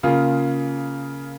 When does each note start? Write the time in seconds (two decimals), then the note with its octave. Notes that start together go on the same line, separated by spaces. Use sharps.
0.03 C#3 A#3 F4 G#4